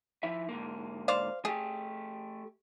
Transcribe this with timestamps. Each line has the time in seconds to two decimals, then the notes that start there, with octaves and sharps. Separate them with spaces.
0.23 F3 E4 E5
0.49 G#2 D3 A#3
1.08 C5 D5 F5
1.45 A3 G4 G#4